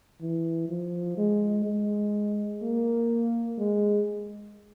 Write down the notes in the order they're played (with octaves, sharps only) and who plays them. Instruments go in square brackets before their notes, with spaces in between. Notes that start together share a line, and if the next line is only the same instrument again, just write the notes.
[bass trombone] E3
F3
G#3
G#3
A#3
G#3